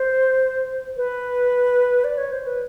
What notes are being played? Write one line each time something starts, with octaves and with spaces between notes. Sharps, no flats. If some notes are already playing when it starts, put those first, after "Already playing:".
Already playing: C5
B4
D5
C#5
C5
B4